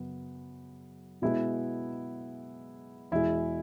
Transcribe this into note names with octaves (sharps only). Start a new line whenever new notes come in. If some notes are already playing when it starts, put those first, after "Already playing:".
Already playing: F#2 C#3 B3
B2 G#3 B3 E4
E2 B2 G#3 E4